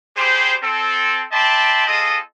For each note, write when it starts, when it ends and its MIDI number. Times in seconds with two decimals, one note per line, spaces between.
0.16 0.54 55
0.16 0.54 67
0.16 0.54 68
0.16 0.54 72
0.62 1.22 60
0.62 1.22 69
1.32 1.84 74
1.32 1.84 76
1.32 1.84 79
1.32 1.84 81
1.32 1.84 83
1.32 1.84 84
1.87 2.17 60
1.87 2.17 65
1.87 2.17 68
1.87 2.17 69
1.87 2.17 75